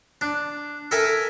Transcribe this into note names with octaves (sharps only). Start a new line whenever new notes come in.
D4
A4 A#4 E5 G#5